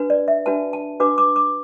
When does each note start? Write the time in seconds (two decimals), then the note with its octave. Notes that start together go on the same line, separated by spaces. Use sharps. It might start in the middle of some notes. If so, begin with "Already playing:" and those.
Already playing: D4 F#4 B4
0.10 D5
0.28 E5
0.46 D4 F#4 B4 A5
0.73 A5
1.00 D4 F#4 B4 D6
1.18 D6
1.36 D6